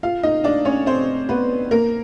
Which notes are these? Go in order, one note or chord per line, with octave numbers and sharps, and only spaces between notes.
F4 F5
D#4 D#5
D4 D5
C#4 C#5
C4 C5
B3 B4
A#3 A#4